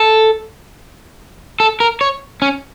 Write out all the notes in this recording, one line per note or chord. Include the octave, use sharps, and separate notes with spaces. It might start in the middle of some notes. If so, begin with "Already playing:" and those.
Already playing: A4
A4
A#4
C#5
C#4